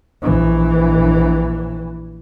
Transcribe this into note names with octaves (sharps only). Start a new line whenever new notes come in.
A#1 E3